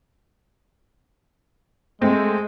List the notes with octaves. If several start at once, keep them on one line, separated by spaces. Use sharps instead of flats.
G#3 A3 C4